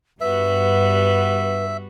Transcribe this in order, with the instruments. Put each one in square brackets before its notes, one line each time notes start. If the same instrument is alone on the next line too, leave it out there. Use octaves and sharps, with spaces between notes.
[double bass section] G2 [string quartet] G3 B3 F#4 [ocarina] B4 [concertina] E5